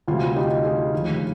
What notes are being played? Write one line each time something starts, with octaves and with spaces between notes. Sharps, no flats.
D2 C3 G3 F4
D#4 G4
F4 G#4
F1 D#2 D3